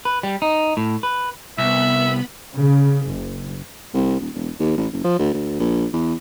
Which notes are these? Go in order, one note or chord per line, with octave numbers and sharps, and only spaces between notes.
B4
G3
D#4
A2
B4
C2 B3 E5 B5
C#3
F#1
C2
D#1
E1
D#2
A1
F#1
F3
D2
D2
A#1
E2